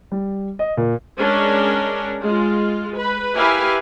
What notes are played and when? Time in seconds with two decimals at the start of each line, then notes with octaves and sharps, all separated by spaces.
0.12 G3
0.59 D#5
0.77 A#2
1.19 G#3 C#4 D4 G#4 A#4
2.23 G#3 F4
2.96 B4
3.35 E4 G4 A#4 B4 F5 G#5